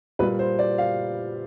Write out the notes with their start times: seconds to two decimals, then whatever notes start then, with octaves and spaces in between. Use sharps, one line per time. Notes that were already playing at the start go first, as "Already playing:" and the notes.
0.19 A#2 G3 A#3 B4
0.39 C5
0.59 D5
0.78 F5